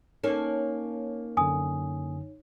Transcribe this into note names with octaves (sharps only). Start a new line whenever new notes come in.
A#3 C#4 D#4 A4 C#5
F#2 D3 G#5 D#6